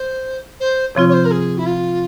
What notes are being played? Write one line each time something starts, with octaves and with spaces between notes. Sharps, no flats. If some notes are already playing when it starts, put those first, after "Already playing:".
Already playing: C5
C5
C3 F3 C4 F4 C#5
C#5
C5
A#4
G#4
E4
F4